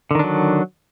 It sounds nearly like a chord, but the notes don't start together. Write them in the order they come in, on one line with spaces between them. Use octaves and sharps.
D3 D#3 D4 F#3